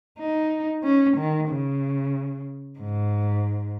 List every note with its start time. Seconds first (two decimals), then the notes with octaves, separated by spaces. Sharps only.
0.19 D#4
0.84 C#4
1.17 D#3
1.49 C#3
2.79 G#2